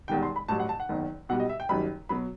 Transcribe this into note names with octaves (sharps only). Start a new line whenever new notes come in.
E1 E2 D#3 G3 G5
C6
B5
A1 G2 F#3 A5
F#5
A5
F#5
F#1 E2 D#3
B1 B2 G3 F#5
D#5
E5
G5
F#1 F#2 D#3 G3 B5
B2 F#3 B5